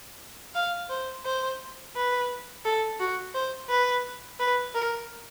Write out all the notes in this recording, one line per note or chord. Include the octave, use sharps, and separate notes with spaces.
F5
C5
C5
B4
A4
F#4
C5
B4
B4
A#4